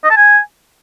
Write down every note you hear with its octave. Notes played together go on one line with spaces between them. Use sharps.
D#5
A5
G#5